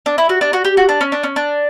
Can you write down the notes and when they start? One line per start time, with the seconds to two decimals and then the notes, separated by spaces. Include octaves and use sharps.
0.06 D4
0.18 E4
0.29 F#4
0.41 D4
0.53 F#4
0.65 G4
0.77 F#4
0.89 D4
1.01 C#4
1.12 D4
1.23 C#4
1.36 D4